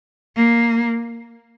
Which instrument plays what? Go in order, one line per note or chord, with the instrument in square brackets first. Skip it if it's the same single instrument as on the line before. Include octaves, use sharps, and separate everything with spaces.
[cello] A#3